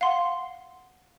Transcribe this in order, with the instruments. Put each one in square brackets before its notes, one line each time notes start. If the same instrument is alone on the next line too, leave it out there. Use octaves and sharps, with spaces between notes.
[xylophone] F5 F#5 C6